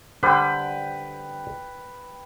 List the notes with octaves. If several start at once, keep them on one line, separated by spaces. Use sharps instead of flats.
D3 G3 B4 C5 G5